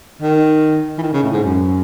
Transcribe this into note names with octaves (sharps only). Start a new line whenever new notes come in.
D#3
E3
D#3
C#3
A2
G#2
F#2